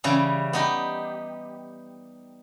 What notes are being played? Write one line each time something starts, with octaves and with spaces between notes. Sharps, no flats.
C#3 E3 G3
B3 D#4 G4